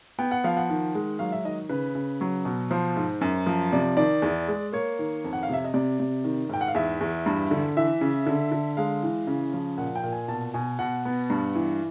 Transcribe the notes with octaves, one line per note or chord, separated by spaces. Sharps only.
B3 G5
F#5
F3 F5
F#5
D#3
G#3
F#3 F5
E5
D#3 D#5
C#3 B4
C#3
F#3
B2
F3 C5
G#2
F#2
F3
C3 D5
D#3 D5
E2
G#3
A#3 C#5
D#3
F2
F#5
F5
C3 E5
D#5
C3 D5
C3
D#3
G#2 G5
F#5
F5
E2 E5
E2
G2
D3
E3 E5
C#3
D3
D3
G#3 F5
E3
C#3
F3
A#2 F#5
G5
A#2
G#5
B2 A5
B2 G#5
B2 F#5
B3
G2
E3